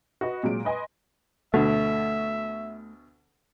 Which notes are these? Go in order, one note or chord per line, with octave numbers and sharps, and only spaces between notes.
F#4 B4 D#5
A#2 F#3 G#3 D7
B4 D#5 G#5 C6
D2 B2 A3 E5